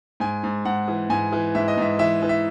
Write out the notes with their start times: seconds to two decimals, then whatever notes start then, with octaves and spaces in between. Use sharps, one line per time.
0.20 G#2 G#5
0.44 G#2
0.65 G#2 F#5
0.88 E3
1.10 G#2 G#5
1.32 E3
1.55 G#2 E5
1.68 D#5
1.78 G#2 E5
1.99 E3 E5
2.22 E3
2.29 E5